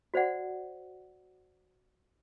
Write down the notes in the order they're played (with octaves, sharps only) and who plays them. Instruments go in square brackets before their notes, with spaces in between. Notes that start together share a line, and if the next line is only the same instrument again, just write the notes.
[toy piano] F#4 C5 D5 F#5